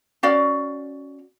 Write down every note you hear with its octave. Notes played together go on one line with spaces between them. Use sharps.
C#4 F#4 D5 F5